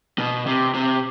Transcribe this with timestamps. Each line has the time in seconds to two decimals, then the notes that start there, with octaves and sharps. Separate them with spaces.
0.19 B2
0.47 C3
0.74 C3